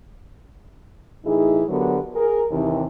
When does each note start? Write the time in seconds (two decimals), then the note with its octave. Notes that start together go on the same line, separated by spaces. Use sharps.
1.24 A2 E3 D#4 E4 G#4
1.68 D3 F#3 B3 G4 A#4 B4
2.15 G#4 A#4
2.51 D#2 C3 E3